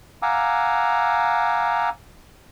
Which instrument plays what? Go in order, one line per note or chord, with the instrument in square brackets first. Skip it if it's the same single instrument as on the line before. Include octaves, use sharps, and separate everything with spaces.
[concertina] F5 F#5 G#5 A#5 D6 E6